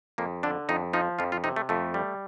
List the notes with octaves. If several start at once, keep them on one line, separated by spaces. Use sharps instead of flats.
F2 A#3
D3 D4
F2 D#4
F3 D#4
F2 F4
F4
C3 D#4
A3
F2 A3
G3